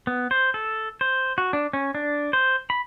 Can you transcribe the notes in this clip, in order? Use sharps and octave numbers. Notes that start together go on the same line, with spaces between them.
B3
C5
A4
C5
F#4
D4
C#4
D4
C5
B5